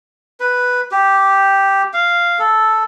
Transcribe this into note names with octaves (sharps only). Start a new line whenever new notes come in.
B4
G4
F5
A4